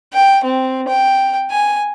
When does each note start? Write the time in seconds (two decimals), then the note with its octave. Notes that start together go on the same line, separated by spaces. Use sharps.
0.13 G5
0.44 C4
0.88 G5
1.51 G#5